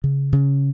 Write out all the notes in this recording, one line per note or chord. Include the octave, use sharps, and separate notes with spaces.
C#3
C#3